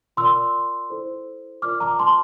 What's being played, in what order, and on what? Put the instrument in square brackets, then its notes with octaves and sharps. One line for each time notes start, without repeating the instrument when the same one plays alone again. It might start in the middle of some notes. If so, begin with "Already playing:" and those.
[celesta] F4 A#4 D5 C6 E6
E4 A4 C5
F4 A#4 D5 D6 F6
A#5 D6
A5 C6